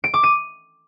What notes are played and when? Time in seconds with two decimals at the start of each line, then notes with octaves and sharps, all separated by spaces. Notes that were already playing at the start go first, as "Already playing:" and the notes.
0.04 D7
0.14 D6
0.23 D#7